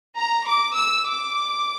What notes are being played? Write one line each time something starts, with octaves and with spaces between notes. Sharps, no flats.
A#5
D6
E6
D6